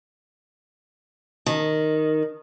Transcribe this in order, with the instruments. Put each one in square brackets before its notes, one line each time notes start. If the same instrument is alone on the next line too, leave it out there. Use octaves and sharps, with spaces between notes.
[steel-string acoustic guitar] D#3